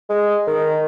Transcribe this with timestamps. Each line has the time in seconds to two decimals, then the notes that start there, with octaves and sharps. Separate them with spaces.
0.09 G#3
0.47 D#3